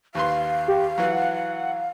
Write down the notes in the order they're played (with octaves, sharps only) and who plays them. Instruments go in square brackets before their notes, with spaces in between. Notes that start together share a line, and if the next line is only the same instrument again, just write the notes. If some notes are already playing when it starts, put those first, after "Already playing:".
[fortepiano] D#2 B4 C6 [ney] F5
[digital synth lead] G4
[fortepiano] E3 F#3 [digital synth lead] F#5